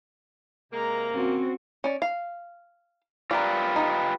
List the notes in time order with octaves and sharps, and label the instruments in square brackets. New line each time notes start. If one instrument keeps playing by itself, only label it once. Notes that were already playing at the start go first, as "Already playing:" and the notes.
[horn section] C3 A#3 [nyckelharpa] G#3 A#5
[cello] C4 F#4 [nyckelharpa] C#4
[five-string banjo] C#4 D5
F5
[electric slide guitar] F4 G4 B4 [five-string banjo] A#4 D5
[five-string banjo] D#4